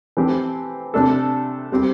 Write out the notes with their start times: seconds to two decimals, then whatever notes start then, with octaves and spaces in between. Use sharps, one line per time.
0.17 E3 A3 C4 G4
0.94 C3 A3 D4 A4
1.72 G3 C4 G4